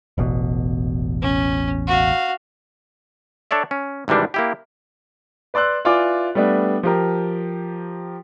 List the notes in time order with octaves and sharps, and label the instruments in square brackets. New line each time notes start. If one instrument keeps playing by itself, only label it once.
[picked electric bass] E1 A1 B2
[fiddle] C#4
F#4 F5
[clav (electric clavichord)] D4 A4 C#5 D5 E5
C#4
G#1 C3 E3 G3 D4
A#3 E4 G4
[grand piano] B4 D5 C6 E6 F#6
E4 F4 B4 D5 G#5 D6
G3 A3 B3 D4
F3 G4 A#4